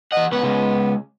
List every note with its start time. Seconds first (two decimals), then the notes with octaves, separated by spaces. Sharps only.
0.12 E3 D#5 F#5
0.32 C#2 B3 F#5
0.43 C#3 G#3